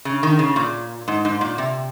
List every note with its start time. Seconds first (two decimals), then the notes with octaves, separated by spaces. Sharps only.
0.05 C#3
0.23 D#3
0.39 C#3
0.56 A#2
1.08 G#2
1.25 G#2
1.41 A#2
1.58 C3